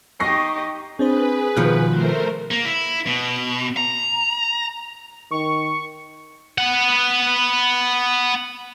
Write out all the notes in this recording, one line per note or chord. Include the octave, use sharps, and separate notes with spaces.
D#4 G4 D#5 C#6 A#6 C7
C4 D4 G#4 B4 C5
B2 D#3 F3 F#6
A3 A#4 C5
A#3
E4
B2
A#5
D#3 C#6
B3 F#5